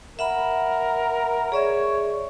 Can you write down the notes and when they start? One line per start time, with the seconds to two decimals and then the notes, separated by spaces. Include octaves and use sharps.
0.19 A#4 E5 F#5 B5
1.52 G#4 C#5 D5 E5